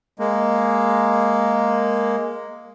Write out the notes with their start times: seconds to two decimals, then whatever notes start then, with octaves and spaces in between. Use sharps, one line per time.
0.19 G#3 A#3